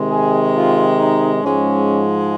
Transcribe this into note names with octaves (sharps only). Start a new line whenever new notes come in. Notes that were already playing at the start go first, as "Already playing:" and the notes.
Already playing: C3 D#3 G#3
G#4
F4
D#4
G#2 F3 G#3 C#4